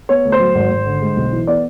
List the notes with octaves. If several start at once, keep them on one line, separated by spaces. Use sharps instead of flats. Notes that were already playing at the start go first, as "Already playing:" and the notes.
B3 C#5
D2
C5
F#3
G#1
G#1
D3
G#3
B1
E3
B3 D5